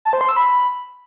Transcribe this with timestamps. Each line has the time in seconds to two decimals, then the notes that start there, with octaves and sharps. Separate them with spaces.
0.05 A5
0.13 C5
0.21 C6
0.29 E6
0.37 B5